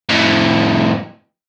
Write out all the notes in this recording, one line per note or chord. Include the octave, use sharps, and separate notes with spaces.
F2 A2